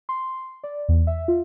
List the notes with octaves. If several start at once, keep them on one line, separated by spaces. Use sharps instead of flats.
C6
D5
E2
E5
F4